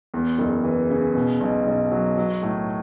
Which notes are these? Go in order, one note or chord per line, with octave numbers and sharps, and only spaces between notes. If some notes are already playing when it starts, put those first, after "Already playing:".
E2
F#1
E3
C#3
B2
B1
B1
F#3
F#3
A2